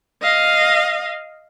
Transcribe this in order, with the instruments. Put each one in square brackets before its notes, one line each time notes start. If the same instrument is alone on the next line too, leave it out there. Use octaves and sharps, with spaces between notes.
[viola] D#5 F5